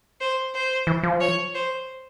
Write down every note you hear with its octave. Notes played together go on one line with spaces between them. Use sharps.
C5
C5
E3
F3
C#5
C5